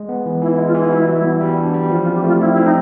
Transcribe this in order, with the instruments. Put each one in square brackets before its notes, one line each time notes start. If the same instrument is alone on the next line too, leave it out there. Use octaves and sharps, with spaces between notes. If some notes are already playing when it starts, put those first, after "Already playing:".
Already playing: [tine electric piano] G#3
B3
E3
[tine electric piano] E3 [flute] E4
[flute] E4
[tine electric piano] G#3
[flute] F4
[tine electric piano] E3 [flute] E4
[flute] E4 [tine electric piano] F#4
[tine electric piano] G3
[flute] E4
[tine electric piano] B3
G3
D4
G3
[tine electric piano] F3 [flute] F4
[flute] F4
[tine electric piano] C4
[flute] G4
[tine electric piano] A3 [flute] F4
[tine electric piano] C4 [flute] E4
[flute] E4
[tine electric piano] C4
[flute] D#4